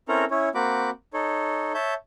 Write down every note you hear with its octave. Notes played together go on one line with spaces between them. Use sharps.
C4 C#4 E4 A4 A#4 A#5
C#4 E4 C#5
A#3 C4 F#4 B5 D6
D#4 A4 C#5
C#5 E5 A5 G6